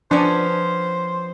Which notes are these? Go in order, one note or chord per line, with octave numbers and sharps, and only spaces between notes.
F3 B3 C#4 D4 C5 D5